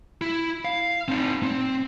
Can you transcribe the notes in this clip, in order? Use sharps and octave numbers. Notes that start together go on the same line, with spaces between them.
E4
F5
C4 D#4
C4